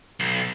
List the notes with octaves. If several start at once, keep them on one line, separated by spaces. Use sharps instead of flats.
B1